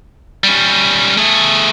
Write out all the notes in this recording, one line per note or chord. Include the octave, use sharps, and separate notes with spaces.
G3 C#4
A3 G#4